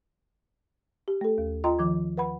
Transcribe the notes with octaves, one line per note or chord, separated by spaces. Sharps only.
G4
A3 A4
D#2
F4 D#5 G5 A#5 C6
D#3 F3 D6 G#6
B4 F#5 B5